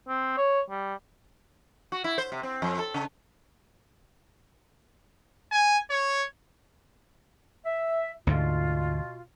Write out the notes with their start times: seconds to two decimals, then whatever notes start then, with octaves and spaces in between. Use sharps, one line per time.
0.08 C4
0.38 C#5
0.70 G3
1.92 F#4
2.04 E4
2.18 C5
2.32 C3
2.43 C4
2.62 F2
2.79 A4
2.94 C#3
5.52 G#5
5.90 C#5
7.65 E5
8.27 D2 G#2 B2 D3 F4